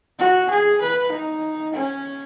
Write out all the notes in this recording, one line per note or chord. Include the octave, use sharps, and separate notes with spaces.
F#4
G#4
B4
D#4
C#4